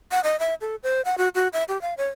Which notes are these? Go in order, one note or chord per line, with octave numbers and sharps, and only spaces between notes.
F#5
D#5
E5
A4
C5
F#5
F#4
F#4
E5
G4
F5
C#5